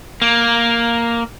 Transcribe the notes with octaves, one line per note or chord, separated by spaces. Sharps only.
A#3